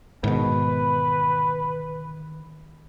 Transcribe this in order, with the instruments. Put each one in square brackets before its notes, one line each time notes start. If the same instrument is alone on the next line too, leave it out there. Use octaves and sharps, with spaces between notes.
[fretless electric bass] G#2 B2 [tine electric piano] D#3 [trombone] B4